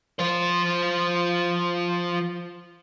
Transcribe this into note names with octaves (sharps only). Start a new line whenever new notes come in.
F3 C5